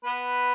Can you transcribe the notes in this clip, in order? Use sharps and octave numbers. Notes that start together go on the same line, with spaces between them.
B3 B4